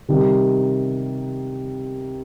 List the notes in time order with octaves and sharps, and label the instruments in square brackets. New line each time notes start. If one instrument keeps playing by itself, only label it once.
[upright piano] C3 D#3 G3